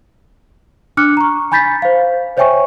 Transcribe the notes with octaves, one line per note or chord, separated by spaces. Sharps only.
D4 D6 F6 F#6 C#7
A#5 C#6
G#5 B5 G6 A6 B6
C5 F5
C5 C#5 E5 G5 G#5 C#6